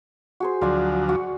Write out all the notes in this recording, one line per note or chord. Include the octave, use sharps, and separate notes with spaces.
F#4 G#4 C5
D2 F3 F#3 C5 D5 G#5
F#4